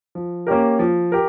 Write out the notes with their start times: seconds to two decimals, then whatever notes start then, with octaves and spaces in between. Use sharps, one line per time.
0.15 F3
0.47 A#3 C#4 G4 A#4
0.79 F3
1.12 G4 A#4